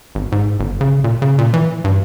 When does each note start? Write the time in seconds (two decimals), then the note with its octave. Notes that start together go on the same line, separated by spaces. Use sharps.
0.15 G#1
0.32 G#2
0.60 G1
0.81 C#3
1.04 A#2
1.22 C#3
1.38 A#2
1.54 E3
1.84 G2